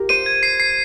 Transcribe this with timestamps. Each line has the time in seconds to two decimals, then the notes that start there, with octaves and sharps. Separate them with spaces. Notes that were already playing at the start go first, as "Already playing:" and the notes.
Already playing: F4 G4 A#4
0.09 C5 D#7
0.26 G#6
0.43 C7
0.60 C7